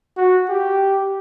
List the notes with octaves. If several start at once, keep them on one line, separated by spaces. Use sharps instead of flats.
F#4
G4